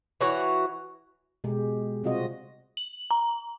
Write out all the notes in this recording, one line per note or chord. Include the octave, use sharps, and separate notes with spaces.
E3 F#4 C#5 F#5
B2 G#3 G4
C3 G3 C4 F4 F#4 D#5
F#7
A#5